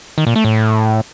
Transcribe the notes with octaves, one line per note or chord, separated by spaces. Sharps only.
D#3
A#2
A3
A2